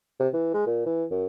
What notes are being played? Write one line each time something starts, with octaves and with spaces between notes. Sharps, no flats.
C3
E3
G#3
A#2
E3
F#2